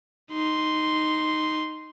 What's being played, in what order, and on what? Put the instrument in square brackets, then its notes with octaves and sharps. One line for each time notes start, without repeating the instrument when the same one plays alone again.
[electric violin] D#4 C6